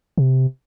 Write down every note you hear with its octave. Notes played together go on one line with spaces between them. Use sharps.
C3